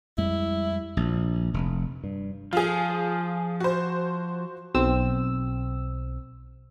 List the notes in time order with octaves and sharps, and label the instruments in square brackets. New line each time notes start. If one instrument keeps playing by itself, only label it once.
[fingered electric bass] F2 G3 G#3 [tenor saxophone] E4
[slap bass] A#1
F1
G2
[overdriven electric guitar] F3 [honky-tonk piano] F4 G#4
[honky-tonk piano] F#4 C5
[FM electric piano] B1 C4 E6